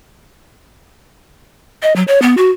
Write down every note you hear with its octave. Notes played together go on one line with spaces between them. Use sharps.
D#5
F#3
C#5
B3
F#4